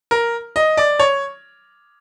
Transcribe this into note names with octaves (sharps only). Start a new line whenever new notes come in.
A#4
D#5
D5
C#5